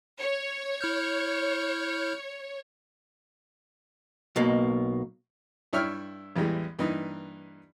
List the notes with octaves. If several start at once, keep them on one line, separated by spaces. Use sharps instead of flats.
C#5
E4 F6 G6
B1 B2 A#3
G2 E4 C#5 E5 G5 F6
A1 E2 E3 G3 G#3
G2 E3 A#3 D#4